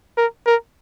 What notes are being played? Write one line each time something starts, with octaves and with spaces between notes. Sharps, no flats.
A#4
A#4